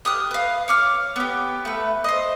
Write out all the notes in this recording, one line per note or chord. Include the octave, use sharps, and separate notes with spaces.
G4 D#6 F6 F#6
B4 F5
C#5 D6 F6
B3 G4
A3 B4
C5 D#5